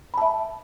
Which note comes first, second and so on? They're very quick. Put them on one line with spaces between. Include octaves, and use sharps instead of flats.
B5 A5 E5